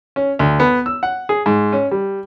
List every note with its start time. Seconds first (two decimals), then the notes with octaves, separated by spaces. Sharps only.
0.16 C#4
0.39 D2
0.60 B3
0.86 E6
1.03 F#5
1.29 G#4
1.46 G#2
1.73 C#4
1.91 G3